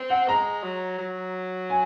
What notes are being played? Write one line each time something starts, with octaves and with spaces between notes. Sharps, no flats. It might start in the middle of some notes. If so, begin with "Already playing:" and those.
Already playing: C4
F#5
G#3 A#5
F#3
F#3
G#5